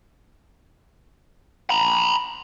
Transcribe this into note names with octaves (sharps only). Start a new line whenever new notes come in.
A#5 B5